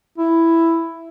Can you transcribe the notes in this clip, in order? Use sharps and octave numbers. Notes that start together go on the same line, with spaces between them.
E4